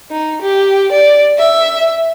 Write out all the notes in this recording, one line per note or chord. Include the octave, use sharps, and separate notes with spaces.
D#4
G4
D5
E5